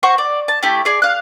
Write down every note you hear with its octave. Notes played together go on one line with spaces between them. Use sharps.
F#4 C5 C#6
D5
A5
A3 E4 G4
G#4 D5
F5 F#6